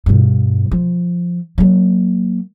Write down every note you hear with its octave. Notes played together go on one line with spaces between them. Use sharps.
G2 B2
F3
F#3 A#3